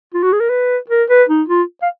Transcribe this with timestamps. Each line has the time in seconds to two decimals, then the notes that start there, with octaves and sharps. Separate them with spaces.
0.14 F4
0.23 F#4
0.33 G#4
0.40 A#4
0.50 B4
0.90 A#4
1.10 B4
1.29 D#4
1.49 F4
1.82 F5